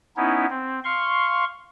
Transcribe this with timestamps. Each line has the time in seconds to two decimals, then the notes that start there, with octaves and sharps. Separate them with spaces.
0.17 B3 C#4 D#4 E4
0.50 C4
0.84 F5 C6 C#6